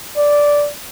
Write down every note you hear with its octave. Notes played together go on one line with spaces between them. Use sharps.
D5